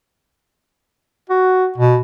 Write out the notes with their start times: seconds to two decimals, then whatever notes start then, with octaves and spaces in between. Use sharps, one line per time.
1.30 F#4
1.78 B2